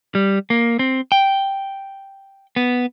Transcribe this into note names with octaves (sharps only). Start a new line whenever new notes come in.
G3
A#3
C4
G5
B3